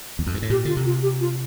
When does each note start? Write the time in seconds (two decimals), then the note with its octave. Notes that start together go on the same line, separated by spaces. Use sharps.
0.19 E2
0.27 F2
0.34 G2
0.42 A2
0.50 A#2 G4
0.65 D3 F4
0.77 C3
0.86 F4
1.03 G4
1.21 F4